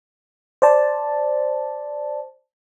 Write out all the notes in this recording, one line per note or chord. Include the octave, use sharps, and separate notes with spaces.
C5 D5 A5